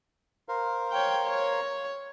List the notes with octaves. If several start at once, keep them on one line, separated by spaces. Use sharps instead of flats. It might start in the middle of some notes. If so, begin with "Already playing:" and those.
A#4 C5 F5
C#5 G5
C#5